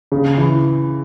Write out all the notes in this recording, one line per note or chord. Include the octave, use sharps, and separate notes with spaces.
C#3
E3